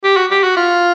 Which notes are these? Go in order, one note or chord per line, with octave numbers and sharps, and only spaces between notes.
G4
F#4
G4
F#4
F4